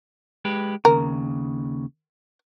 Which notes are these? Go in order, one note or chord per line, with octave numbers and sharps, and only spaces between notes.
G#3 G4 B4
D#2 C#3 A#4